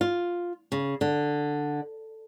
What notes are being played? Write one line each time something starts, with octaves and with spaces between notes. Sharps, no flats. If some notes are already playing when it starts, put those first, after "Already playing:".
F4
C#3
D3